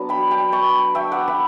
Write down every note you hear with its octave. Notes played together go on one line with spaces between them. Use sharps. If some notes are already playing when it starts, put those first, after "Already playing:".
Already playing: F#3 B3 D4 A5
G5 B5
G5 B5
A5 C#6
E5 G5
D5 F#5
G5 B5